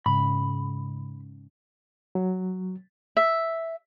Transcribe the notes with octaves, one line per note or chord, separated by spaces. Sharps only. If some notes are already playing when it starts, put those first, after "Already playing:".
G#2 C#3 B5
F#3
E5